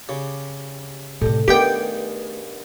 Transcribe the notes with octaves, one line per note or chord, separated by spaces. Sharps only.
C#3 G4
A2 C3 G4 A4 D#5
G2 D#3 A3 B3 G4 G#4 G5